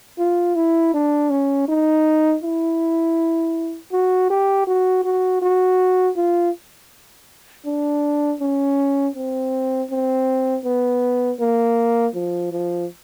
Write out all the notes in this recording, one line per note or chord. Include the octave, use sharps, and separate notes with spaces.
F4
E4
D4
C#4
D#4
E4
F#4
G4
F#4
F#4
F#4
F4
D4
C#4
C4
C4
B3
A#3
F3
F3